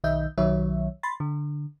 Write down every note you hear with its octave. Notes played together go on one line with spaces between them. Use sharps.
B1 D#3 D#5 E5 G6
B1 D#3 F#3 C#5 E5
B5 C6 A6
D3